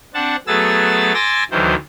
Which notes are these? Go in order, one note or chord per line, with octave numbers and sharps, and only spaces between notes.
C4 D4 F#5 A5
F#3 A3 B3 G#4 E6 A6
G#5 C6 D6 E6 A6 A#6
D2 D#3 E3 F#3 C5